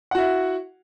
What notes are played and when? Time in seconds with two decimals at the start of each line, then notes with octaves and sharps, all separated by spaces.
0.11 F#5
0.15 F#4
0.18 E4